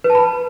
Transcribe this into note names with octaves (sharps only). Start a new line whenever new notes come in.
B4
A5
B5